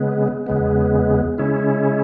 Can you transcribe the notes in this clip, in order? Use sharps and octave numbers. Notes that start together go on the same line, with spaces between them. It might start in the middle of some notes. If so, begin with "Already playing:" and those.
Already playing: C#3 G#3 B3
E2 C#3 G#3 B3
C#3 G#3 C#4 E4